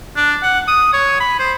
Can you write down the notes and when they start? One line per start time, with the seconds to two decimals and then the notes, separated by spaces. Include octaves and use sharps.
0.16 D4
0.43 F#5
0.67 D#6
0.93 C#5
1.20 B5
1.39 C5